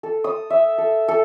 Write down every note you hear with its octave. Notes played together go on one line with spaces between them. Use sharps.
A4
D#6
E5
A4
A4